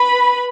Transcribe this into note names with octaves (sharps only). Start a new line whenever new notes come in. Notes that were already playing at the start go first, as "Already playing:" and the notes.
Already playing: B4 B5